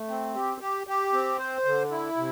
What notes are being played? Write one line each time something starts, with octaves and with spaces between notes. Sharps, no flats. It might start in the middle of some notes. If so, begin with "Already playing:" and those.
Already playing: A3
C4
G4
G4
G4
C4
C5
D3
E4
C3